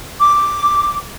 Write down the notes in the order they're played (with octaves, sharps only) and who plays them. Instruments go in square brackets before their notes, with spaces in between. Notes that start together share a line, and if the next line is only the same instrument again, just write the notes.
[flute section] D6